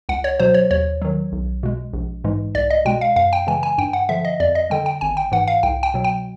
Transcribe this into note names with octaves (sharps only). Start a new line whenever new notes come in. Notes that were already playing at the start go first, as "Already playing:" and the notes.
C#2 F#5
C#5
B2 F#3 C5
C#5
D#2 C#5
D#3 F#3
B1
B2 G#3
A#1
G#2 E3 G#3
C2 D5
D#5
B2 G#3 G5
F5
F#2 F5
G5
C#3 E3 G#3 G#5
G#5
G2 G5
F#5
D3 F3 E5
D#5
F2 D5
D#5
D3 G3 G5
G5
G#1 G#5
G5
G#2 E3 F#5
F5
C2 G5
G5
B2 F#3
G5